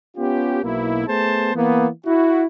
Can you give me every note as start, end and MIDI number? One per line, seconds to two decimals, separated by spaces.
0.17 0.62 59
0.17 0.62 61
0.17 0.62 65
0.17 0.62 67
0.62 1.04 35
0.62 1.04 47
0.62 1.04 58
0.62 1.04 64
1.07 1.52 57
1.07 1.52 59
1.07 1.52 68
1.07 1.52 72
1.07 1.52 81
1.54 1.86 52
1.54 1.86 58
1.54 1.86 59
2.06 2.44 64
2.06 2.44 66